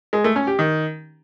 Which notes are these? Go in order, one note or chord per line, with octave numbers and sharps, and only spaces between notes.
G#3
A3
C#4
G4
D#3